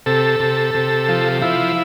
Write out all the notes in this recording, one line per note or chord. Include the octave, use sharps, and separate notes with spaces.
C3 A4
C3
C3
F3
F3 E4